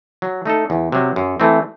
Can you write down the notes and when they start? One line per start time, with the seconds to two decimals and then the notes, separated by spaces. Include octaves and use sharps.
0.22 F#3
0.46 A3 D#4 A4
0.70 E2
0.92 C3 F#3
1.16 F#2
1.40 E3 A3 C4